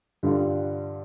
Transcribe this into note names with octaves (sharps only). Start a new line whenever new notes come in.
G2 D3 G3 D4 F4